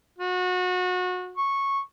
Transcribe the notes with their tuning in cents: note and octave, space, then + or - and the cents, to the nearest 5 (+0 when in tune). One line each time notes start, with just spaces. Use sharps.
F#4 -30
C#6 -10